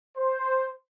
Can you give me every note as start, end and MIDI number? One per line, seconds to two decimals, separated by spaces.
0.17 0.69 72